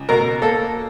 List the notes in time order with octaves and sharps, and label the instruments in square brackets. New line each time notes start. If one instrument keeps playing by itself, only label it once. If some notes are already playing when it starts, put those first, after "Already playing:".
Already playing: [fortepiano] C#2
B2 A#4
A#3 A4